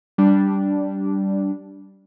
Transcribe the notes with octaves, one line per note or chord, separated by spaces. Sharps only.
G3 D4